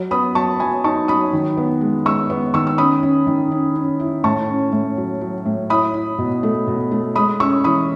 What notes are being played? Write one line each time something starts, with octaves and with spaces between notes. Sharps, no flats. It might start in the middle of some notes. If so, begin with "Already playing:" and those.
Already playing: F#3
B3 B5 D#6
F#3 A5 C#6
F#3 G#5 B5
D#4 A5 C#6
F#3 B5 D#6
D#3
B3
G#3
G#3 C#6 E6
B3
D#3 C#6 E6
E6
C#4 B5 D#6
C#4
D#3
C#4
C#4
E4
A2 A5 C#6
C#4
A2
F#3
F#3
A2
E4 B5 D#6
E4
B2
A3
B2
A3
G#3 B5 D#6
C#4 C#6 E6
E3 B5 D#6